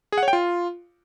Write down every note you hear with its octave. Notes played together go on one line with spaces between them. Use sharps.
G#4
F#5
C#5
G5
F4